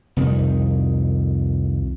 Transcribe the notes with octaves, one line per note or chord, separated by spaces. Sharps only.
C2 F2 D#3